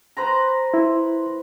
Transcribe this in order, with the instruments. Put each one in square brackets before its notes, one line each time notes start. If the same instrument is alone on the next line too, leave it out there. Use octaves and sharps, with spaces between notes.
[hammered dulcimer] B4 C5 A#5
[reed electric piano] E4